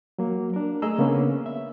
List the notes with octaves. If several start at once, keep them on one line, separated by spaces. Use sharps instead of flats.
F#3 A#3
D4 A#4
A3 G#4 D#5 A#5 E6
C#3 A#3 B3 C#4 D4
E5